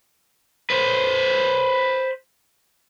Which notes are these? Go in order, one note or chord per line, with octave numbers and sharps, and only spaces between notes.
B4 C5